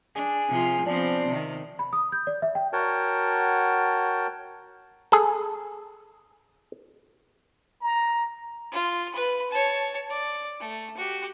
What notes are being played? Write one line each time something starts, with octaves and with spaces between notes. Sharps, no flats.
D4 G#4
C3 F3 F4
F3 B3 C4 D4
C3 D#3
B5
D#6
G6
D5
E5
G5
F#4 A#4 C#5 F#5 G5 A5
G#4 A4
A#5
F4
B4 B5
C#5 A5
D5
A3
F#4 G4